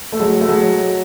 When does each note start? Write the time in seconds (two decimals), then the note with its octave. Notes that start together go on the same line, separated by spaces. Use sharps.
0.12 A3
0.20 F#3 G#3
0.41 A3
0.49 F#3 G#3